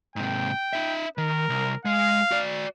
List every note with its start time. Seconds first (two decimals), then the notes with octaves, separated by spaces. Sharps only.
0.16 G#2 C3 G5
0.73 D#4 E5
1.18 D#3 A#4
1.49 C2
1.85 G#3 F5
2.31 F#4 D5